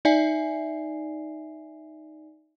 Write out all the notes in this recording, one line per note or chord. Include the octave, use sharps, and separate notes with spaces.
D#4 D5 E5 G#5 C7